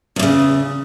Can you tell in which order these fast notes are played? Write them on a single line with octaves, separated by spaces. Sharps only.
E2 A#2 C#3